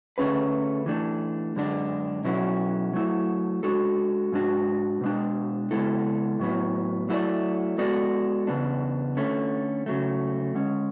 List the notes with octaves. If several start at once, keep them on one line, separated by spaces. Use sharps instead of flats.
D3 A3 C#4 G#4 B4
E3 A3 D4
F#2 D3 G#3 D4
B2 F#3 C#4 E4
F#3 A3 E4
G#3 D4 F#4 A4
G#2 G#3 D4 F#4
B2 G#3 D4
C#3 G#3 B3 E4 A4
A2 F#3 B3 E4
F#3 A3 E4 B4 D5
G#3 B3 F#4 A4 D5
E2 C#3 B3 D4
D3 A3 C#4
C#3 F#3 A3
D3 G#3 C#4